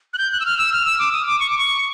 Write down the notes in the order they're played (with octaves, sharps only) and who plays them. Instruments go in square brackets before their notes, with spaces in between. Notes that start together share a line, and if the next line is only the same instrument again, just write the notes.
[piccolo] F#6
G6
F#6
E6
F6
E6
F6
E6
D6
D#6
D6
C#6
D6
C#6